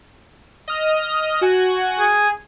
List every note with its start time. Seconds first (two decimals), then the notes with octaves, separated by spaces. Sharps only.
0.68 D#5 D#6 F6
1.41 F#4 F#5 G#5
2.00 G#4